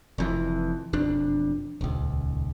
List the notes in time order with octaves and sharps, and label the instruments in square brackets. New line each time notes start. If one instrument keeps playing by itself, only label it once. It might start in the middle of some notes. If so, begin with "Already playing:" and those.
[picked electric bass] F1 F2 E3
E1 F2 D4
D#1 C#2